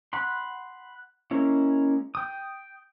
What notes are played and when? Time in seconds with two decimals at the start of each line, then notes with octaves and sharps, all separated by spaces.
0.13 F#5 B5 C6
1.31 G#3 A#3 C#4 E4
2.15 G5 D#6